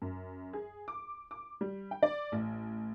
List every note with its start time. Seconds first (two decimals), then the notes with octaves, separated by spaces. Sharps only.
0.02 F#2
0.53 G#4
0.88 D6
1.31 D6
1.61 G3
1.91 G5
2.03 D5
2.32 A1